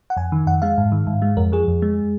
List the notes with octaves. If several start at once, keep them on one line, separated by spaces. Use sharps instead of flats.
F#5
F2 G#5
D#3
F2 F#5
G#3 F5
G#2
D#3
G#2
G#3
F2 A#4
F3 G#4
F2
G#3